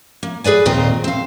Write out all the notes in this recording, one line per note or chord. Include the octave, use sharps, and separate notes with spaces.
A#3
G#4 B4 D5 G#5
D#2 A#2 C4 F4 D#5
C4 F5